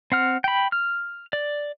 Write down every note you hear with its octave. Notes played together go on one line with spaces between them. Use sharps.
C4 F#5 F6
G5 B5
F6
D5